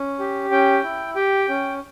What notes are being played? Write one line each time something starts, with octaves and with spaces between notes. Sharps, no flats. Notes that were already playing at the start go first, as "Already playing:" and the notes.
Already playing: C#4
G4
C#4 G5
E4
G4 G5
C#4